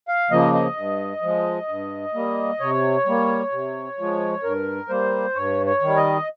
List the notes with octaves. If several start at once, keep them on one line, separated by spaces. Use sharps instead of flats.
F5
C#3 F3 A#3 D#5
D#5
G2
F3 G#3
G2
G3 A#3
C3 C#5
G3 A#3
C3
F3 G#3
G2 A#4
G3 A#3 C5
G2 C#5
C#5
D#3 G3
D#5